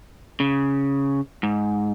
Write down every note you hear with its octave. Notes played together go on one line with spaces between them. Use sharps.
C#3
G#2